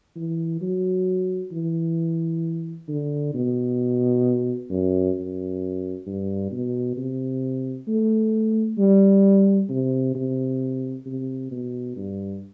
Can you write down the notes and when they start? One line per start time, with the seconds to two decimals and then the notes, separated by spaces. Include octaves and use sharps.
0.16 E3
0.62 F#3
1.52 E3
2.88 D3
3.34 B2
4.70 F#2
5.15 F#2
6.07 G2
6.52 B2
6.97 C3
7.88 A3
8.78 G3
9.69 C3
10.15 C3
11.06 C3
11.51 B2
11.97 G2